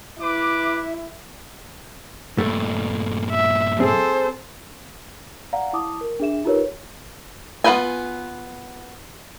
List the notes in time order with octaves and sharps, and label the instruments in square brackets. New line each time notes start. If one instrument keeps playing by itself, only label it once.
[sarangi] E4 [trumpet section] B4 D6
[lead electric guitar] G2 A#2 [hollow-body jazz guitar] A3
[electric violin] E5
[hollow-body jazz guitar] C4 G#4 [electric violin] A4 C5
[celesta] D5 F5 F#5 A#5
E4 A5 D6 D#6
A#4
D4 G#4 E5 E7
D#4 F4 G4 A#4 B4 C#5
[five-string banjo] B3 F4 B4 G5 G#5